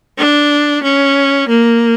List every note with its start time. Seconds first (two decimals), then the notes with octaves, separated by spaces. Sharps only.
0.18 D4
0.83 C#4
1.48 A#3